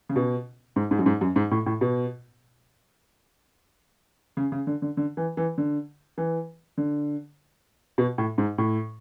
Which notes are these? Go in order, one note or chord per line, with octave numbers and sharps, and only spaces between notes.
C#3
B2
G#2
G#2
F#2
G#2
F#2
G#2
A2
A2
B2
C#3
C#3
D3
D3
D3
E3
E3
D3
E3
D3
B2
A2
G#2
A2